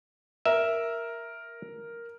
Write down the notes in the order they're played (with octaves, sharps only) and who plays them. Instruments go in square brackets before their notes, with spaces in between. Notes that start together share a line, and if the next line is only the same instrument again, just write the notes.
[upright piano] A#4 [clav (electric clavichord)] E5